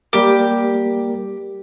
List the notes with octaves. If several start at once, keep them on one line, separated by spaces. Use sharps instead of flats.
G3 A#3 G4 A#4